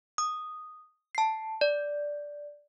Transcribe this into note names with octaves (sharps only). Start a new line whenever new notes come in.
D#6
A5 C7
D5